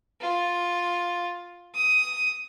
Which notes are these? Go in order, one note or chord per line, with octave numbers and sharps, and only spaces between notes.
F4
D#6